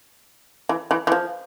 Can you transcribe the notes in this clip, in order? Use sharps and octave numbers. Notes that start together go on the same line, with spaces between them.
E3
E3
E3
F3